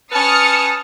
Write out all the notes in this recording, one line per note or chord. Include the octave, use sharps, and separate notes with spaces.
C#4 B4 A5 D#6 F6 C#7